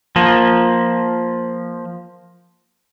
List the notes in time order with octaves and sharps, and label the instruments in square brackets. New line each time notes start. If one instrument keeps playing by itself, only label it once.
[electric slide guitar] F3 A#3